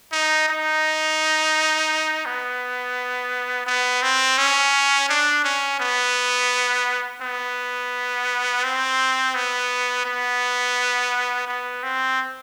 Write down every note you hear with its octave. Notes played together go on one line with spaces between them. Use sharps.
D#4
D#4
B3
B3
C4
C#4
D4
C#4
B3
B3
C4
B3
B3
B3
C4